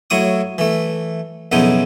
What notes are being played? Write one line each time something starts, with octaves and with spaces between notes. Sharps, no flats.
A2 F#3 E4 C#6 D#6
E3 A3
B1 F2 C#3 B3 D#4 E4